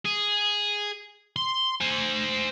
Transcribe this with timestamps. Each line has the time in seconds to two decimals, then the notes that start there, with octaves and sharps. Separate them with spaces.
0.05 G#4
1.36 C6
1.81 C5 G#5